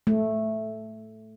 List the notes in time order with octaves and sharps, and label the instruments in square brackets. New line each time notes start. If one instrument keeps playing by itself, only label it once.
[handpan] A3